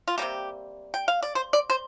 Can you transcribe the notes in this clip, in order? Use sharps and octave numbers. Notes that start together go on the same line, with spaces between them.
F4
C3 G3 A#3 G4
G5
F5
D5
C5
D5
C5